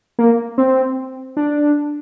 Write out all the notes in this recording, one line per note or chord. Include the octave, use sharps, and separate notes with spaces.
A#3
C4
D4